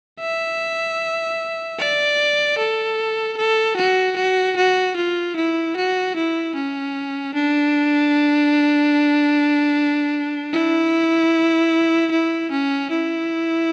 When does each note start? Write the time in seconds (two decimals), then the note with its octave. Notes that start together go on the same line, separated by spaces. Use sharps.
0.20 E5
1.79 D5
2.58 A4
3.37 A4
3.77 F#4
4.16 F#4
4.57 F#4
4.96 F4
5.36 E4
5.77 F#4
6.16 E4
6.55 C#4
7.35 D4
10.52 E4
12.11 E4
12.51 C#4
12.91 E4